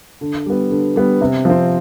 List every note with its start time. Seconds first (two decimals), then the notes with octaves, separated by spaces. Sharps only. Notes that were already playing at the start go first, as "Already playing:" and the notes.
0.21 D3
0.46 G3 B3
0.71 D3
0.96 G3 B3
1.21 C3
1.45 F3 C4